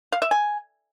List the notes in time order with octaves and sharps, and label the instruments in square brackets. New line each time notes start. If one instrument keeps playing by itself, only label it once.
[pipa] F5
E5
G#5